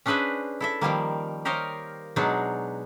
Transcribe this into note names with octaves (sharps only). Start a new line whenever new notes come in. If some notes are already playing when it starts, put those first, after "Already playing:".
C#4 D4 G#4 B4 C5 E5
E4 A4 E5
D#3 F3 G3 A#3
G4 A#4 C5 C#5 D#5 F5
B2 F#3 G#3 D4 D#4 G#4